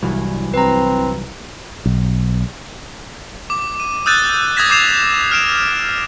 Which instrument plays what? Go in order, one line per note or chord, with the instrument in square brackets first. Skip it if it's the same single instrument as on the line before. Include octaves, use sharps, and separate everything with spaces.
[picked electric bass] C2 [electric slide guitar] G2 E3 F#3
[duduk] C4 [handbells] B4 A#5
[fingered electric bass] B1
[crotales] D6
D#7
D#6 E6 F#6 G6 A6 D#7
D#6 G6 G#6 A#6 B6 E7
D6 G6 C7 E7 F7
F6 C7 D7 E7